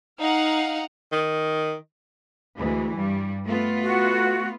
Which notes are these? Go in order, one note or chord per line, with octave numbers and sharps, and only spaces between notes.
D#4 F5 F#5
D#3
D2 E3 G#3
G2 G3
A3 B3 F4
F#4